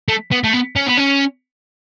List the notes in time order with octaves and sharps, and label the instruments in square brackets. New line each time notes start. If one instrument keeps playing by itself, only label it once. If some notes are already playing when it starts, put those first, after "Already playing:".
[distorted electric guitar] A3
B3
A3
B3
C#4
B3
C#4